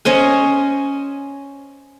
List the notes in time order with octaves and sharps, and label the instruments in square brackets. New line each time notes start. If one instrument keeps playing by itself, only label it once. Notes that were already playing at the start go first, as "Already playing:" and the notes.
[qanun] C#4 C5 D#5 G#5